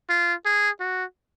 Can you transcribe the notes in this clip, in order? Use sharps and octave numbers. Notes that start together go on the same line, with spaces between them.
F4
G#4
F#4